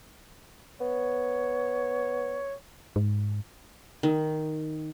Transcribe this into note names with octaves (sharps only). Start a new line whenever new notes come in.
B3 C#5
G#2
D#3